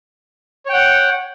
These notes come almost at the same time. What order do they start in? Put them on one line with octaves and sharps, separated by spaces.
C#5 G5 F#5